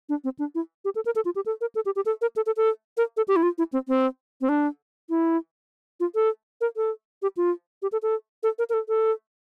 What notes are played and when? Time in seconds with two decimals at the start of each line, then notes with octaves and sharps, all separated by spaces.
0.09 D4
0.24 C4
0.39 D4
0.55 E4
0.85 G4
0.95 A4
1.06 A#4
1.16 A4
1.25 F4
1.36 G4
1.46 A4
1.61 A#4
1.75 A4
1.86 G4
1.96 G4
2.06 A4
2.21 A#4
2.36 A4
2.46 A4
2.57 A4
2.97 A#4
3.17 A4
3.28 G4
3.36 E4
3.43 F4
3.58 E4
3.73 C4
3.88 C4
4.41 C4
4.49 D4
5.10 E4
6.00 F4
6.15 A4
6.61 A#4
6.77 A4
7.22 G4
7.37 F4
7.82 G4
7.92 A4
8.03 A4
8.43 A4
8.59 A#4
8.69 A#4
8.74 A4
8.89 A4